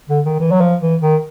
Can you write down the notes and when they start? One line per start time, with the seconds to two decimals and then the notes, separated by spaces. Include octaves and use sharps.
0.09 D3
0.25 D#3
0.40 E3
0.51 F#3
0.61 F3
0.81 E3
1.01 D#3